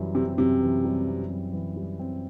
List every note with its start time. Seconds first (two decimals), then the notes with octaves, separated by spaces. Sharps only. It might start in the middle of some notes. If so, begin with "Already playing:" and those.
Already playing: F#2 E3 G3
0.15 C3 C4
0.38 F#2 C3
0.62 E3
0.85 G3
1.07 C4
1.30 F#2
1.53 E3
1.76 G3
1.99 C4